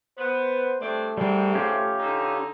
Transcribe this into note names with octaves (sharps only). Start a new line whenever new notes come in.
B3 C5
G2 A3 C4 D5
G#2 C3 G3 C4
C#4 F4 G4
D3 D#4